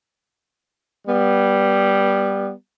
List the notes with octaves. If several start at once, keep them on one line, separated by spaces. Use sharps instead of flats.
G3 B3